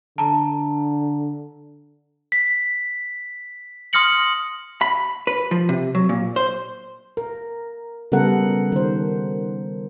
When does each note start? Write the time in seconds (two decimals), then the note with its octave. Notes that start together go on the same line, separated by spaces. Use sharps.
0.18 D3 A5 A#5
2.32 B6
3.93 C6 D#6 F6 A#6 C#7 F#7
4.81 B5
5.27 B4
5.51 F3
5.69 C3
5.95 F#3
6.09 A#2
6.36 C5
7.17 A#4
8.12 C#3 G3 B3 A4 A#4 F#5
8.72 D#3 C5